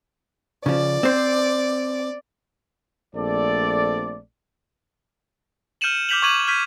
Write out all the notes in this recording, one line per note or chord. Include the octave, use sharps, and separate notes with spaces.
C#3 F3 D5
C4 C5
A#1 A3 C4 A4 D5
F6 G6 C#7 D#7 E7 F#7
D6 F6 G6 B6 F7 F#7
C#6 D6 G#6 D#7 F#7
C#6 F6 G6 G#6 B6 D#7